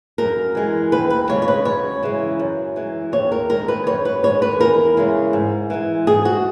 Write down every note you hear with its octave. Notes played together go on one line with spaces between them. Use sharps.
F#2 A#4
E3 G#3
D#2 B4
B4
C#3 G#3 C#5
C#5
B4
F#2 C#5
C#3 E3 G#3
F#2
E3 G#3
D#2 C#5
A#4
D#3 G#3 A#4
B4
F#2 C#5
B4
D#3 G#3 C#5
B4
E2 A#4
C#3 E3 G#3
G#2
E3 G#3
G#2 G#4
F#4